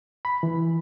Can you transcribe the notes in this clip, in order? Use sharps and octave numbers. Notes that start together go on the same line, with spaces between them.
B5
E3